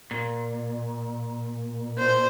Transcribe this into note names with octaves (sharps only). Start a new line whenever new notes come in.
A#2
C5